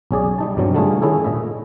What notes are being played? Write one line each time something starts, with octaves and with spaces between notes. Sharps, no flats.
B1 C#4 G#4 D5
G3 D#4 A5
G2 B2 F#3 C4
D3 G3 A3 D#4 F4 G#4
D#3 G#3 C#4 E4 G#4 A4
A#2 D#5 E5